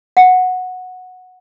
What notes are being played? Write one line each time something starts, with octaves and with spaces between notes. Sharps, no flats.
F#5